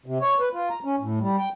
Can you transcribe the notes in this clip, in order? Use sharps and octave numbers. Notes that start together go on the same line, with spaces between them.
C3
C#5
B4
F4
A#5
C#4
A2
G3
G5